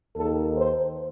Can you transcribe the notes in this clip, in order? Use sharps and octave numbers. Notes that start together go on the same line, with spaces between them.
D#2 D#3 A4
C5